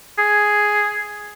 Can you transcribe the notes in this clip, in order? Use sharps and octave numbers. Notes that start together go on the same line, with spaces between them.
G#4